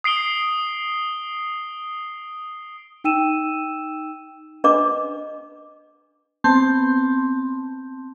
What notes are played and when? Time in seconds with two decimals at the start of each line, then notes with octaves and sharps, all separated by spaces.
0.04 D#6 C7 D7 G7
3.04 D#4 G5 E6 D#7 E7
4.64 D4 B4 D#5 D6
6.44 B3 C4 A5 C6 G6